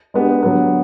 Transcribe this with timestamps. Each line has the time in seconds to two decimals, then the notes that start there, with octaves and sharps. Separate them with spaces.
0.14 G#3 B3 D4 G4
0.43 D3 F#3 B3